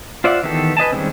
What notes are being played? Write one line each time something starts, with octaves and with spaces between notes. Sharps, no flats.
F4 C5 D5 E5 F#5
D#3 E3 B3 G4 A4
B4 D#5 G#5 A5
D#3 G3 G#3 C4 C#4